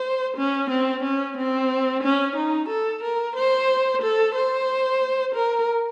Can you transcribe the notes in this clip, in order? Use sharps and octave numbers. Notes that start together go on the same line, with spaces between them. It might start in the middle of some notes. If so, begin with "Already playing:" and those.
Already playing: C5
C#4
C4
C#4
C4
C#4
D#4
A4
A#4
C5
A4
C5
A#4